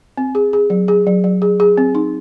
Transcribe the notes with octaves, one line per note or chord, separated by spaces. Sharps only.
C4
G#4
G#4
F#3
G#4
F#3
F#3
G#4
G#4
C4
D#4